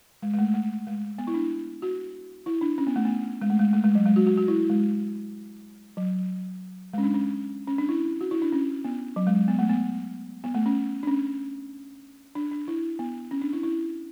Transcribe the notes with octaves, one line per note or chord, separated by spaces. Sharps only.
G#3
G#3
A3
A3
G#3
B3
E4
D4
F#4
E4
D4
C#4
B3
A3
B3
G#3
A3
G#3
A3
G#3
F#3
G#3
F#4
F#4
F#4
E4
G#3
F#3
G#3 C#4
D4
C#4
C#4
D4
E4
F#4
E4
D4
C#4
B3
F#3
G#3
B3
A3
B3
B3
A3
C#4
D4
C#4
D4
D4
E4
B3
C#4
D4
E4
E4